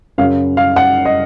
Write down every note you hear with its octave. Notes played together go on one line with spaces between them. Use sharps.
F#2 C#3 F#3 F5
F5
F#5
D#5